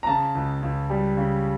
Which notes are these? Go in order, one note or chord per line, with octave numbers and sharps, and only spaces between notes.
A#5
C#3 A5
C#2
C#2
G3
C#3